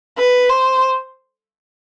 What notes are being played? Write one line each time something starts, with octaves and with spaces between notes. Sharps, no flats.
B4
C5